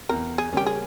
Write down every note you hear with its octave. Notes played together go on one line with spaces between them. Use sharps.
E2 A#4
G#4
C#3 G3 A#3 C#4 G4
G#4